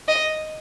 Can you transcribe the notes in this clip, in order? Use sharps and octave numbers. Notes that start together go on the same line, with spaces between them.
D#5